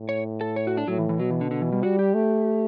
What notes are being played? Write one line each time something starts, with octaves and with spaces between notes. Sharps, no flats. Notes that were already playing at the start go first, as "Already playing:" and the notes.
Already playing: A2
C#5
A4
C#5
F#4
D4
A2 F#3
E3
E3
B2 F#3
E3
D3
D3
E3
G3
G3 F#4
G4
A3